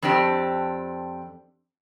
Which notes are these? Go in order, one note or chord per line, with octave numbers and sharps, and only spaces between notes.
F2 C4 D4 G4 A5